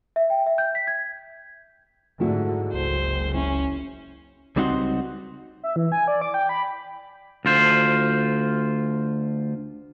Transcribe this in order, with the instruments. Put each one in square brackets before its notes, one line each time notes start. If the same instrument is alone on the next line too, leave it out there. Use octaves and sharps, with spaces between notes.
[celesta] E5
G5
E5
G6
B6
G#6
[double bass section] G#2 D3 [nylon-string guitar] A3 E4 F#4
[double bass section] F#1 [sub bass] C#2 [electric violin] C5
[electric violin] C#4 [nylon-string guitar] E4
[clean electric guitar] C#2 G3 C4 D#4 F#4 C6
[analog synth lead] E5
E3
G#5
D5
D6
G5
B5
[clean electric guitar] D2 F4 C5